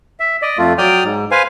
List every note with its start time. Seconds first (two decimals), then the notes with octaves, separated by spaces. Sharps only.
0.20 E5
0.42 D5 D#5
0.58 F2 A3 F4
0.78 F#3 D5 G5 D#6 F6
1.04 G#2
1.31 B4 C5 F5 G#5